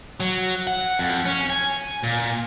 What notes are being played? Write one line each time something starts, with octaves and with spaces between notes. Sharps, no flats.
F#3
F#5
F2
C#4
G#5
A#2